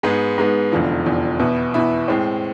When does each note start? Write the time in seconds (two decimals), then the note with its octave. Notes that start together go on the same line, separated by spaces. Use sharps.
0.03 G#2 G#3 B3
0.38 G#2 G#3 B3
0.72 F1 E2 D3 F3
1.05 F1 E2 D3 F3
1.39 E2 B2 B3 E4
1.74 E2 B2 B3 E4
2.08 A2 G#3 C4